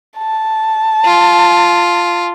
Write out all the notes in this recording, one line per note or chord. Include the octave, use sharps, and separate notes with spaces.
A5
F4